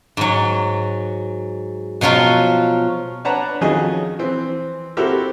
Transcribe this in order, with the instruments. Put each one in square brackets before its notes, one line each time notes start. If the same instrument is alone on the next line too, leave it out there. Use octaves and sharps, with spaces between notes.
[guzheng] G#2 F#3
B2 F3 F#3 F4
[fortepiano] D4 B4 C#5 F#5 A5 A#5
F2 D#3 F#3 C#4 G#4 D#5
E3 C4
C4 E4 F#4 G4 A4 A#4